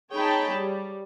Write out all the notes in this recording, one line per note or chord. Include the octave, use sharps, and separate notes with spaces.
D#4 G#4 C#5 G5 A5 B5
G3